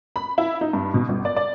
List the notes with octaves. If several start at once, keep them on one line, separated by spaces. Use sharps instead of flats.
B5
E4
D#4
G2
B2
G1
D5
D5